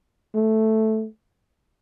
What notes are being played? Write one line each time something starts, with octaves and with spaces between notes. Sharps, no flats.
A3